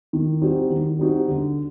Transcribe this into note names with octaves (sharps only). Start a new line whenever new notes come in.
D#3
G3 C4 D#4 F#4
D#3
G3 C4 D#4 F#4
D3